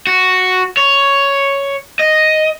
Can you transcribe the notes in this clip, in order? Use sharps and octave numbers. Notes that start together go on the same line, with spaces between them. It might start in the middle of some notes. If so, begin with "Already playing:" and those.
F#4
C#5
D#5